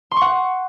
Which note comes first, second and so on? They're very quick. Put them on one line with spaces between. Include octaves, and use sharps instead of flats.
C6 C#6 F#5